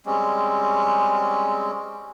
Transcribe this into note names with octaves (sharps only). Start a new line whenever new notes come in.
G3 G#3 C4 C#4